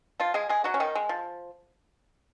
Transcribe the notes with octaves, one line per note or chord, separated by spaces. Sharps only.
F3 F4
G#3 G#4
G#3 G#4
F#3 F#4
C#4
D#3 D#4
G#3
F3